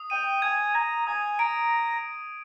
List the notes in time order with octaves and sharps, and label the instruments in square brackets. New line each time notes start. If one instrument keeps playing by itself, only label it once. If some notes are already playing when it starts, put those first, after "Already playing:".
Already playing: [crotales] D#6
[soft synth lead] G5 [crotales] D#7
[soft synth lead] G#5 [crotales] G#6
[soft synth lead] A#5 [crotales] G#6
[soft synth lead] G#5 [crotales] D#6
[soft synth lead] A#5 [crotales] D7